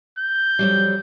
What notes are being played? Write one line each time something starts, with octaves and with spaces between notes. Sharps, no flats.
G6
F2 F#3 G3